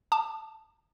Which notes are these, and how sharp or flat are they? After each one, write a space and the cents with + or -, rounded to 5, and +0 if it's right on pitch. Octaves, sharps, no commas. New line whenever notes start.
A5 +0 D6 +35